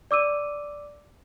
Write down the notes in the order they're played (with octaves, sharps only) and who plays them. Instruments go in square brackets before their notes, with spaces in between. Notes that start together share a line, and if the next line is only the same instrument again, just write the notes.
[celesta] D5 D6 E6 D#7